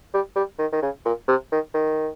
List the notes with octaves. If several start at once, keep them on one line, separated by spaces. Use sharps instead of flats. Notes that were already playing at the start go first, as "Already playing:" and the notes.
G3
G3
D#3
D#3
C#3
A#2
C3
D#3
D#3